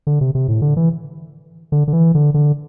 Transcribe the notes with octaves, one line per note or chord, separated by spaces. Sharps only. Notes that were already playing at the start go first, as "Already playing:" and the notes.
D3
C3
C3
A2
D3
E3
D3
D3
E3
D3
D3